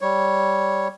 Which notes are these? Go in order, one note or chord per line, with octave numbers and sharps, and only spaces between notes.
G3 C#5